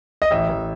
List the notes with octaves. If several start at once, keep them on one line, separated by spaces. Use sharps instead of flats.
D#5
A1 E5
A1